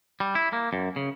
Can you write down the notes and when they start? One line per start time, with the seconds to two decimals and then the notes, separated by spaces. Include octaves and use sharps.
0.20 G3
0.35 E4
0.53 A#3
0.73 F#2
0.96 C#3